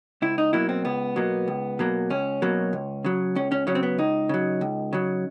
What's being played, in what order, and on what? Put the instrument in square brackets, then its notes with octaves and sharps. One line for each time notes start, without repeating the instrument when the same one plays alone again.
[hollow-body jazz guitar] C#2 E4
D#4
B2 F#3 A#3 E4
C4
C#2 B3
B2 F#3 A#3
C#2
B2 F#3 A#3
C#2 C#4
B2 F#3 A#3
C#2
C#3 F#3
C#2 C#4
C#4
C#3 F#3 C#4
C4
B3
C#2 D#4
C#3 F#3
C#2
C#3 F#3